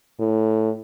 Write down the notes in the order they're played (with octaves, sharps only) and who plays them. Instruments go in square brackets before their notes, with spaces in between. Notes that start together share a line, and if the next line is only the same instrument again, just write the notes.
[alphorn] A2